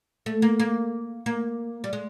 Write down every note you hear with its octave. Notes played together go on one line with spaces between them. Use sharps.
A3
A#3
A#3
A#3
G3
G#3